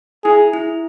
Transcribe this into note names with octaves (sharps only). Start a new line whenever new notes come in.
E4 G#4
E4